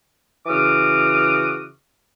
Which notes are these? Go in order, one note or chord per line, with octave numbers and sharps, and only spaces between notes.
C#3 E3 F#4 D6 D#6 F6